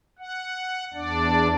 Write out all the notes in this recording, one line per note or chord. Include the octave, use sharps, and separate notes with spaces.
F#5
E2 D4 D5